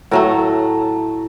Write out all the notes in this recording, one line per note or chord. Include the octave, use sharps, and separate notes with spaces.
A2 F#3 A3 A5 A#5